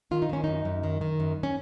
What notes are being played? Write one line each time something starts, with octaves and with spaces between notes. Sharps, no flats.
D#3 F4
D#4
D#3 C#4
F#2 D#4
F#2
D#3
D#3
F#2
C#4